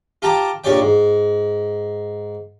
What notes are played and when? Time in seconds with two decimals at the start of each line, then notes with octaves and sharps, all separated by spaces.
0.22 F4 G4 G5 A5 A#5 D6
0.64 A#1 A#2 G4 C#5 D5 G5
0.81 G#2